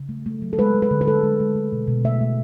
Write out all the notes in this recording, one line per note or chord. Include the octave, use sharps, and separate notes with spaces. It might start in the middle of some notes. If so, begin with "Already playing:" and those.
Already playing: C#3
A3
A3
F#3
A4
G#3 B4
G#3
B4
D3
B4
G#3 A4
G#3
G#3
A3
B2
B2
A3 E5
A3